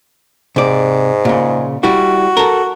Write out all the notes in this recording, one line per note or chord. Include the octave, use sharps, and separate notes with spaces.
G#2 C3 D5
A#2 C#3
G3 E4 F#4
A4 A#4